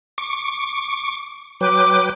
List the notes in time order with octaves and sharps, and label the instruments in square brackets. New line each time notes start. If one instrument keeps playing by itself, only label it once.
[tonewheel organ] C#6 D6
[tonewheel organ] F#3 B4 G5 [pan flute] D6